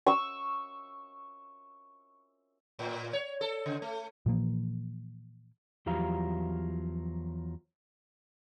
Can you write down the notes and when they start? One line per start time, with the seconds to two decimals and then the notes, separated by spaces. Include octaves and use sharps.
0.06 C#6 E6
2.79 A2
3.13 C#5
3.41 A4
3.66 C#3
3.82 A3
4.26 A#2 E3 F3 A#3
5.86 E2 F3 F#3 G4 F5 A#5